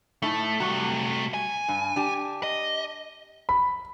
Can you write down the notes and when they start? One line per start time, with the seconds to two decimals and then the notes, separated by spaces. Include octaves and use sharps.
0.22 A2 A3 D#4 A5
0.60 C3 G3 A3 F#4
1.34 G#5
1.68 G2
1.96 D4 G4
2.43 D#5
3.49 B5